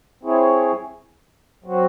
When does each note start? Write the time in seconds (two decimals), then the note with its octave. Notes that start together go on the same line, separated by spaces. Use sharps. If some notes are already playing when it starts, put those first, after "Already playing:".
0.23 C4 E4 G#4 C#5
1.64 F#3 C4 F#4